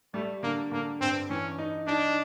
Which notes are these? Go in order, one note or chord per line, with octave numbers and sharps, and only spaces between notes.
G3 A3
D3 A#3
D3 A#3
G2 C4
E3 C#4
D#4
D4 D#4